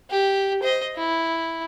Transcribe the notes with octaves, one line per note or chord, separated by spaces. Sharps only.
G4
C5 D#5
E4